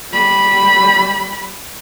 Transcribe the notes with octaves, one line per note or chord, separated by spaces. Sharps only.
G3 B5